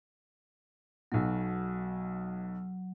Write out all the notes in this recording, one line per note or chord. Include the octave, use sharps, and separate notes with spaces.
B1 B2 F#3